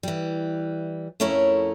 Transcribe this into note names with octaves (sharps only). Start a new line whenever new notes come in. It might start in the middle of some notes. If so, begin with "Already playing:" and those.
E3 G3
F2 A3 C#4 E4 A#4 C#5